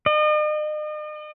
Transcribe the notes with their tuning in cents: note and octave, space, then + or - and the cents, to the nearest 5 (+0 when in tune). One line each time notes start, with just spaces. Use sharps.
D#5 -40